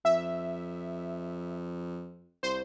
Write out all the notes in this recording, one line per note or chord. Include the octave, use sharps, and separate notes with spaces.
F2 E5
C2 C5